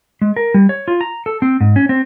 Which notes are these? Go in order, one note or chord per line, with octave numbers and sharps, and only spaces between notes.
G#3
A#4
G3
C#5
F4
A#5
A4
C4
G#2
C#4
C4